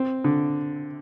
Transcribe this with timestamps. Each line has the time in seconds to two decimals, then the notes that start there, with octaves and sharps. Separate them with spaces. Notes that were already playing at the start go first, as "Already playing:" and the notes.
Already playing: C4
0.24 D3